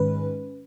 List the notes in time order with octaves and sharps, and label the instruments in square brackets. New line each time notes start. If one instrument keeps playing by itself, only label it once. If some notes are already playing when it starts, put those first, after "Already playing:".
Already playing: [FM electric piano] G#2 D#3 G#3 C#4 B4